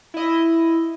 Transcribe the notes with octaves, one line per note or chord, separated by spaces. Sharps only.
E4 D#5